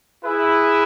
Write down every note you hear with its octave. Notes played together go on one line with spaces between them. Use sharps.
E4 G#4 B4 E5